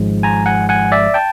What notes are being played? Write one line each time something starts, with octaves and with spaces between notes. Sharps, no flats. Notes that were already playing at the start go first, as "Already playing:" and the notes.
Already playing: G#1 G#2 F3 G#3
G#5 A#5
F#5 G#5
F#5 G#5
D5 E5
G5 A5